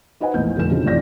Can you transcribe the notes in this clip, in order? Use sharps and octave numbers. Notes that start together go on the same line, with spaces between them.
D#4 B4 C5 D#5 F#5 G#5
A#1 E2 A2 A#3 B3 G6
F1 D3 E7
C#3 F3 C4 D4 D#4 F#4
A1 C3 C#5 D5 G6 A#6